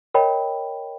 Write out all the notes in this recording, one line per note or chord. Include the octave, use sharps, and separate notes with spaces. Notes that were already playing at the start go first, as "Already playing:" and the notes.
A#4 C#5 D#5 G5 B5